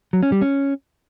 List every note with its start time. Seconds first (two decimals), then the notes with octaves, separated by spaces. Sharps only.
0.13 F#3
0.23 C#4
0.32 G3
0.41 C#4